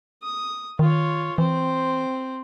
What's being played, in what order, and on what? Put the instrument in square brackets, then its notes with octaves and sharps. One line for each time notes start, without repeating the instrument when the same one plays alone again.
[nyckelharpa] D#6
[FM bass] D#3 [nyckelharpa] F4 C#5
[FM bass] E3 [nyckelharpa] C4 C5